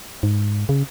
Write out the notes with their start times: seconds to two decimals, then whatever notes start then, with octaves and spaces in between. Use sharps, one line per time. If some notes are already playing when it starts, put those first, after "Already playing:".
0.23 G#2
0.69 C#3